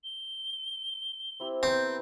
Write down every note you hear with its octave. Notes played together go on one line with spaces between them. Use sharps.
G7
C4 E4 G4
B3 C4 A#5 G6